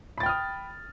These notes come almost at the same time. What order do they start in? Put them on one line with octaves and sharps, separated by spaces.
B5 A6 G5 F6 D#6